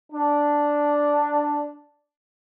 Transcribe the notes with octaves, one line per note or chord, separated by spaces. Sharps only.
D4